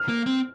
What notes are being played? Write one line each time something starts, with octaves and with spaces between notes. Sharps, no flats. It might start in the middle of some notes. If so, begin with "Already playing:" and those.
Already playing: F6
A#3
C4